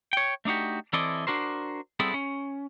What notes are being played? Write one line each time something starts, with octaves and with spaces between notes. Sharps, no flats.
C#5 G5
A3 D4 D#4 F#4 G4
E3 C4 E4 A4 D5 D#5
D4 F#4 A#4 C5
G3 B3 C4 E4 G#4 A4
C#4